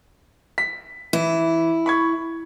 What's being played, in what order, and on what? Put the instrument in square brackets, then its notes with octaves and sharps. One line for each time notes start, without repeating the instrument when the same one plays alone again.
[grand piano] B6
[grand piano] E3 [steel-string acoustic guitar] E4
[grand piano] B5 C#6 G#6